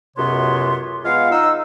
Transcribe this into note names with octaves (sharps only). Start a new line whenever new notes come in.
C#2 F#2 C3 B3 C#5 C6
G#3 B3 F4 F5
D#4 E6